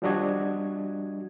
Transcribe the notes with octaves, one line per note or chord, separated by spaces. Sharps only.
F3 G3 D4 F#4 D#5 G#6